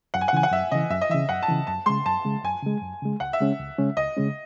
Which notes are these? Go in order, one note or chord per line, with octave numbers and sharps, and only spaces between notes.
F#2 F#5
G#5
F#5
C#3 E3 G#5
F#5
F#2 E5
C#3 E3 D#5
F#2 E5
D#5
C#3 E3 E5
F#2 F#5
A5
C#3 E3
F#2 A5
C#3 G#3 C6
F#2 A5
C#3 G#3
F#2 G#5
C#3 G#3
F#2
C#3 G#3
C#2 F#5
E5
C#3 G#3 C#4
C#2
C#3 G#3 C#4
C#2 D#5
C#3 G#3 C#4